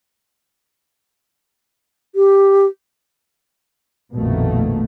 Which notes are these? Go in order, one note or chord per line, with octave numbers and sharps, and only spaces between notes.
G4
A#1 F2 B2 D#3 A3 A#3